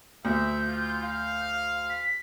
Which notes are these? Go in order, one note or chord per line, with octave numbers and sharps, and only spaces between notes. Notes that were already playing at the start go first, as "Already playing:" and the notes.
D2 E5 G6
F4
F5
B6